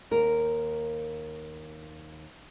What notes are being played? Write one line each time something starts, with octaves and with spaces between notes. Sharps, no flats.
D#2 A#4